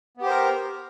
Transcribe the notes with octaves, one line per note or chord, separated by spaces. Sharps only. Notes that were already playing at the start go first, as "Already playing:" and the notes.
B3 G4 A#4 C5